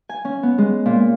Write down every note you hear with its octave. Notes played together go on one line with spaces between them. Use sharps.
G#5
C#4
B3
G#3
A#2